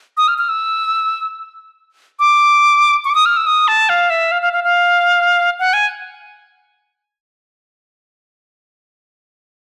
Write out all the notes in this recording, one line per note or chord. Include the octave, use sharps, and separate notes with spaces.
D#6
F6
F6
E6
D6
C#6
D6
D#6
F6
E6
D#6
A5
F5
E5
F5
F5
F5
F5
F#5
G#5